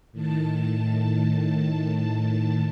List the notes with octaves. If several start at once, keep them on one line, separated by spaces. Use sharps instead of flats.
A2 D#3 A5